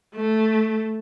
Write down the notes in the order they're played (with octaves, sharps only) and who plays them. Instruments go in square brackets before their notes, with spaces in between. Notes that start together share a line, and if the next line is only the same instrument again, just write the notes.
[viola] A3